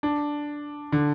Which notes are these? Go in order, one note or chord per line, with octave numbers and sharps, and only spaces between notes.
D4
D3